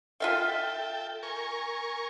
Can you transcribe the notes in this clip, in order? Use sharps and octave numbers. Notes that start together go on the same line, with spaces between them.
F4 A4 E5 F5 G5
A#4 G#5 C#6